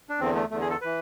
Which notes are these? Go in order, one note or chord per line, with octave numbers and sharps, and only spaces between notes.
D4
E2 D3 C4
A3
E2 D3 A3
G#4
A4
E3 B4